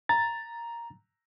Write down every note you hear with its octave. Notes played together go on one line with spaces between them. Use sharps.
A#5 A6